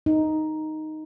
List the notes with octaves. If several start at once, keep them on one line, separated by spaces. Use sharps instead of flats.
D#4